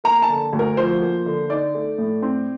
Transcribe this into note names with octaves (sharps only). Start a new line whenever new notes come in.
A#3 A#5
A5
D3
D2
A#4
F3 C5
A#3
D3
D#4 D5
A3
A2
C4